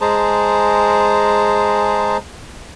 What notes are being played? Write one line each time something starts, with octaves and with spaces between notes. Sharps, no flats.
G#3 G#4 C5 A5 A#5